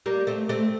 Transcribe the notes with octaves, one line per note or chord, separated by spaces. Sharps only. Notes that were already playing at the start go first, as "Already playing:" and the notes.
G3 A#3
A3 C4
A3 C4